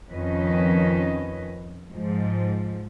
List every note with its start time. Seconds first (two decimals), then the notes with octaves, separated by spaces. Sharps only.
0.11 F2 D#3 C#4 B4 D#5
1.91 G#2 F3